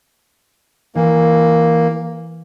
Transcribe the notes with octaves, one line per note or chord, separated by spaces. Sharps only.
E3 A#3